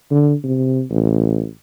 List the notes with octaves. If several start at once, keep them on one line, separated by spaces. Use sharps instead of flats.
D3
C3
A1